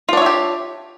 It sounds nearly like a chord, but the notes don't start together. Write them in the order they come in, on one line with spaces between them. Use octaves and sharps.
F4 D4 C#5 E5 G4